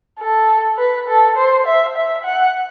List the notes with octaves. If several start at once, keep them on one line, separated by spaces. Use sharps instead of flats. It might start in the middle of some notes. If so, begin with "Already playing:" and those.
A4
B4
A4
C5
E5
E5
F#5